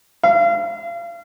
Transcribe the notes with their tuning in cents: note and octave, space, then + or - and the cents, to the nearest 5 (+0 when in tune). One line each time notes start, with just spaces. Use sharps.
F5 -35